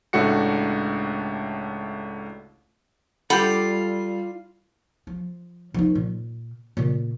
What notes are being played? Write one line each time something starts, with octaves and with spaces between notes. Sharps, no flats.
C#2 A2 A3 D4 F#4 C#7
G3 F4 G4 A4 F#5 B5
F3
F3 D#4
A#2
A#2 C#3